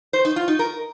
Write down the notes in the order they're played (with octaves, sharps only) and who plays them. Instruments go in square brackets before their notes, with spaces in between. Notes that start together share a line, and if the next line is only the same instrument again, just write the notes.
[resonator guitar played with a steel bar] C5
D#4
F4
D#4
A#4